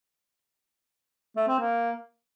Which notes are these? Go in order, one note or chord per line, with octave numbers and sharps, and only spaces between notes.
A3
C4
A#3